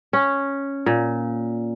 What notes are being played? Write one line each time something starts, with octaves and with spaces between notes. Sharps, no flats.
C#4
A#2